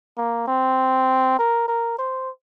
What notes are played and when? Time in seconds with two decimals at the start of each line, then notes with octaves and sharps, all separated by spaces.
0.18 A#3
0.48 C4
1.39 A#4
1.68 A#4
1.98 C5